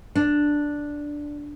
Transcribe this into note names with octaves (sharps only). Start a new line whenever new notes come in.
D4